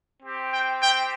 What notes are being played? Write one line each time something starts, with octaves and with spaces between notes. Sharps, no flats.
C4 G4
G5
G5